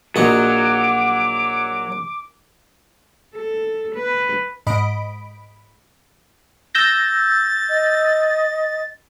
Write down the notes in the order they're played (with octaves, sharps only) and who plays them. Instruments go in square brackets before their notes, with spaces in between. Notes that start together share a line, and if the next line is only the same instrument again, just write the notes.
[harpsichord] A#1 D#4 F#4 [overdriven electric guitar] F#3 [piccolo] D6
[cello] A4
B4
[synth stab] G#2 D#5 B5 D7
[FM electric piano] E6 G6 A#6 [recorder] A6
[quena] D#5